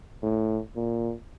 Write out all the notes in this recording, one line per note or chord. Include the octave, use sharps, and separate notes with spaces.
A2
A#2